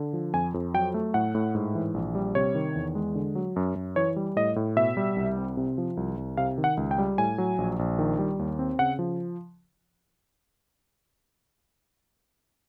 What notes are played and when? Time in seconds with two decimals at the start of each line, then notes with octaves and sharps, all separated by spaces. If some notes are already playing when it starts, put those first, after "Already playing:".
Already playing: D3
0.13 F3
0.34 F2 G#5
0.54 F2
0.74 F#3 G5
0.94 A3
1.14 A2 F#5
1.35 A2
1.55 G#2
1.75 E3
1.94 A#1
2.15 G3
2.35 C3 C#5
2.55 D#3
2.75 E2
2.95 G#3
3.15 D3
3.35 F#3
3.56 F#2
3.76 F#2
3.96 E3 C#5
4.16 G3
4.36 A2 D#5
4.56 A2
4.76 B2 E5
4.97 G3
5.16 C2
5.37 C4
5.57 C3
5.78 F3
5.97 C2
6.17 C2
6.37 C3 F5
6.58 D#3
6.64 F#5
6.77 C#2
6.91 G5
6.98 G3
7.18 A2 G#5
7.38 F#3
7.58 A#1
7.79 A#1
7.99 D#3
8.18 G3
8.39 D#2
8.59 C4
8.79 C#3 F#5
8.99 F3